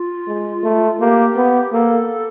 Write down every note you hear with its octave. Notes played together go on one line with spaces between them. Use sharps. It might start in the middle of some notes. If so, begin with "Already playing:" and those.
Already playing: F4
G#3
A3
A#3 G4
B3
A#3 A4